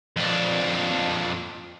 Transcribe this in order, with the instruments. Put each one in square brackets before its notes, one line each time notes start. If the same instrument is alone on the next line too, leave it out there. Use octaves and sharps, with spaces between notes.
[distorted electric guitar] F2 D4